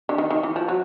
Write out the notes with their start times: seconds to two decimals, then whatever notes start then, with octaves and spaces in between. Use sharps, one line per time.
0.09 D3
0.18 D#3
0.30 D#3
0.43 E3
0.56 F3
0.68 F#3